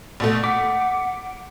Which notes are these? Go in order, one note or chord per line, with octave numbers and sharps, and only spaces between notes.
A#1 B2 A3
F#5 D6 B6